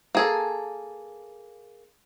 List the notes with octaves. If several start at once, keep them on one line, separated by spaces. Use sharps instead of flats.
A#3 G#4 A4